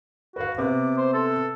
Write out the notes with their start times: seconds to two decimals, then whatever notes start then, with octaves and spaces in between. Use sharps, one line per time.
0.36 F#4 B4 F5
0.58 C3 B3 D6
0.98 C5
1.14 A4